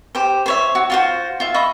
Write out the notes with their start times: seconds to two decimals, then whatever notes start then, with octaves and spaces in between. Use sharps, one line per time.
0.15 G4 C5
0.46 C5 C#5 E5
0.75 F#4
0.90 F4 F#4 C5
1.40 F4 E5
1.54 D#5 E5 B5 C#6